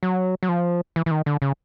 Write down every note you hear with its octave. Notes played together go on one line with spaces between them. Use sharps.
F#3
F#3
F3
E3
E3
D#3
D3
C#3